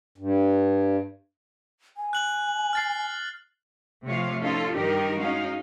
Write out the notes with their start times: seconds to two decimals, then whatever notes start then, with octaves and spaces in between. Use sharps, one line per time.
0.18 G2
1.97 G#5
2.13 F#6 F#7
2.73 F6 A6 C7
4.05 C3 F3 A3 F4 C#5 F5
4.41 C#4 D#4 F4 A4
4.74 G2 D#3 D#4 G4 A#4
5.17 G#3 C#4 D#4 F#4 F5